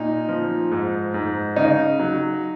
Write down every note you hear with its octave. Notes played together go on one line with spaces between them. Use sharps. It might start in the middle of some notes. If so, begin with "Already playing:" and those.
Already playing: A#2 D#4
F3
G#2
G#2
C#3 D#4
F#3